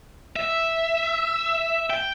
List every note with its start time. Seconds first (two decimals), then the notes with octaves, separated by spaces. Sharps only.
0.36 E5
1.90 G5